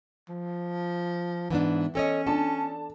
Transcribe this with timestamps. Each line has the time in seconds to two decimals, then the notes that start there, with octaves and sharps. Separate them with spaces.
0.29 F3
1.50 G#2 E3 B3 D4
1.95 C#4 A4 C#5 D#5
2.27 D4 A4 A5